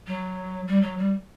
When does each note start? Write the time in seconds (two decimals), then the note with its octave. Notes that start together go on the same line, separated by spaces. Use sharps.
0.07 F#3
0.67 G3
0.82 F#3
0.98 G3